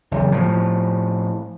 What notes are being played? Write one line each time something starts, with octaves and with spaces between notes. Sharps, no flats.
F#1 E2
A2 F3